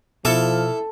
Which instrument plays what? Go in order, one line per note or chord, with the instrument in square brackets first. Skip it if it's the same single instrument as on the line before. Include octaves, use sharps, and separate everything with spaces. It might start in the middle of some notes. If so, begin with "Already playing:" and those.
[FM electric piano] B2 F6 [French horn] F3 [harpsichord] E4 D6 [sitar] A4